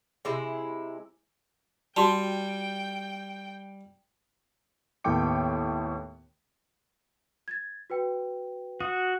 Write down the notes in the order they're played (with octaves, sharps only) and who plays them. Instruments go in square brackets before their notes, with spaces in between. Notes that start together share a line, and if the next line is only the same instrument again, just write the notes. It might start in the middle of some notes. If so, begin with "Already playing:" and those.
[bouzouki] C3 G#3 E4
[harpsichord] G3 [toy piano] F#4 A5 [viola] G5
[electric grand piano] D#2 A2 B3 G5 D6 C#7
[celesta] G#6 A6
F#4 B4 G5
[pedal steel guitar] F#4 [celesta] D#6